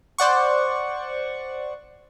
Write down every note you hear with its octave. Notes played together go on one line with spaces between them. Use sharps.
C5 D5 F#5 C#6